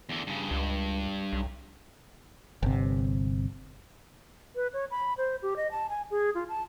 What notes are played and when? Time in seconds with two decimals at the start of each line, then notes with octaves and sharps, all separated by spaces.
0.09 E2 D3
0.27 G2 C#3
0.51 C#2 G2
1.33 B1
2.63 G1 C3
4.56 B4
4.73 C#5
4.91 B5
5.18 C5
5.42 G4
5.56 D#5
5.71 A5
5.89 G#5
6.11 G#4
6.35 F4
6.49 A5